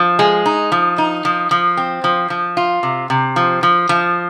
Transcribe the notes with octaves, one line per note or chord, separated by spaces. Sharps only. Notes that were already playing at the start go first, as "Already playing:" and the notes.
Already playing: F3
G#3
D#4
F3
D#4
F3
F3
C4
F3
F3
F4
C3
C3
F3
F3
F3